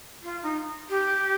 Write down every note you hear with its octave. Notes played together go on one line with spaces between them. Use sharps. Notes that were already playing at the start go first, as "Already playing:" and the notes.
F4
D#4
G4